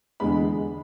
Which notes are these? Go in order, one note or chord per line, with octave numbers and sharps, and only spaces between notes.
E2 D3 G#3 B3 B5